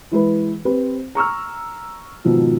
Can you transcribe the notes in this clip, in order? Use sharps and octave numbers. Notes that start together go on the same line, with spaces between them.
E3 G#3 E4 B4
C4 G4 B4 C5
A#5 C#6 E6 F6
G#2 B2 D#3 F3